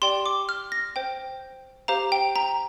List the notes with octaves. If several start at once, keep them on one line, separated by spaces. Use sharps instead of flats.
G4 D5 G5 C6
D6
F6
A#6
C5 G5
G4 C5 F5 A#5
G5
A#5